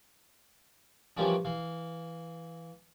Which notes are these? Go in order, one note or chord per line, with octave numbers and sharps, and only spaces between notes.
E3 F3 G3 A#3 C#4 D4
E3 F5